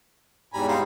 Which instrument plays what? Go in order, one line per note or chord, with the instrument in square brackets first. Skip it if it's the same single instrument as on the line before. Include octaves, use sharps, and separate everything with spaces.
[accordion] E2 G#2 G3 [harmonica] G#5 A#5 B5
[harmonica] D#4 F4 C5